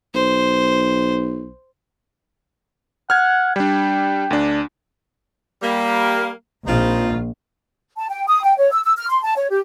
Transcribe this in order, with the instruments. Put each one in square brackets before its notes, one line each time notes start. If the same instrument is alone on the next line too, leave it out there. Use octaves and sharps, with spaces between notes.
[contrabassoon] B1 [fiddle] C5
[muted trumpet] F#5 [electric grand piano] F6 G#6
[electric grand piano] G3 D4 [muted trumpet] G5
[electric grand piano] D2 D4
[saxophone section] G3 A#3
[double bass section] A#1 [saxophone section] C4 D#4 F4
[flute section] A5
G5
D#6
G5
C#5
E6
E6
F6
C6
A5
C#5
G4